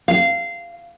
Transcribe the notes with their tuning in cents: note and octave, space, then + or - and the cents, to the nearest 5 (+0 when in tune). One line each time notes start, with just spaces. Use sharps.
F5 -15